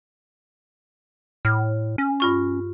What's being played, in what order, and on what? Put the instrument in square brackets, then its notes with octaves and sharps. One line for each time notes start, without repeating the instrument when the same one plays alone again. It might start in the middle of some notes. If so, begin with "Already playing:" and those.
[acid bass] A2 [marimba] F6
[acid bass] C#4
[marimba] G2 F4 C#6